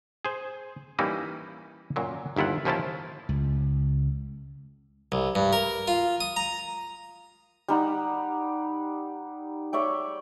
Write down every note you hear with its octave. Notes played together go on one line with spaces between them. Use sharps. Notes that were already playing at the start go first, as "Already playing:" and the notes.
G#4 C5
E3 G3 A#3 C#4 D#4 E4
F#2 A#2 F#3
G1 D#2 E4 F4 F#5
D#2 F3 C#4 E4 F4 A5
C#2
C2
G2
A#4
F4
D#6
A#5
G3 D#4 F#5
C#5 D5 E5 G5